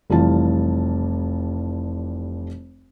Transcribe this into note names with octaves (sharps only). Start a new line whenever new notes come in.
F1 E3 G3 F4 A5